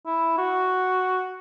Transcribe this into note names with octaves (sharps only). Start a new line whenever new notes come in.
E4
F#4